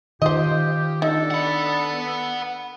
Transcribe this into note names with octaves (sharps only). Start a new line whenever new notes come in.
D#3 F4 G4 C5 D#5
D4 D#4 A4
F#5 B5